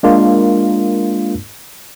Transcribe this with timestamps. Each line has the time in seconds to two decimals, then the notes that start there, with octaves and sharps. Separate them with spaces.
0.03 G#3 A#3 D4 F4 A#4